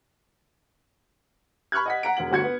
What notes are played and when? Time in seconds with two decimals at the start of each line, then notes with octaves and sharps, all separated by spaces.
1.72 B5 C#6 F6 F#6 G#6
1.86 D#5 F#5 B6
2.03 F#5 A#5 D7
2.17 E1 F#5 F#7
2.31 G1 D2 F#4 G#6 C#7
2.44 B3